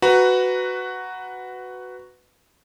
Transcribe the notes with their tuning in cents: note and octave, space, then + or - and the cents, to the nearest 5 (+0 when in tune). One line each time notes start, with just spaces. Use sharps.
F#4 +0 B4 +10 A#5 +10